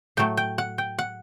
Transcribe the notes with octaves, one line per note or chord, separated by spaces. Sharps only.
A2 F#3 A3 G5
G5
F#5
G5
F#5